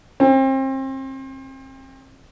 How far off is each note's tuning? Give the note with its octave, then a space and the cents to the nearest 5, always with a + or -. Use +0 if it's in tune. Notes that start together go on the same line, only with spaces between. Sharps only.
C4 +35